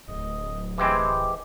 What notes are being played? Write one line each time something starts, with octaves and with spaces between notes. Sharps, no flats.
D1 D#5
E3 G#3 C4 G4